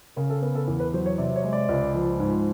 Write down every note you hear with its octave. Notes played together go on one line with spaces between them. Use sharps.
C#3 A#4
A4
B3 A#4
A4
E2 A#4
B4
F#3 C5
C#5
C3 D5
C#5
G#3
D5
C#2
F3
G#2